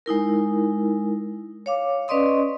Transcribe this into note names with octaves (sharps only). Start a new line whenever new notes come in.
G#3 D#4 E4 A#4
C#5 F5 D6
C#4 B4 D5 D#5 C6 D#6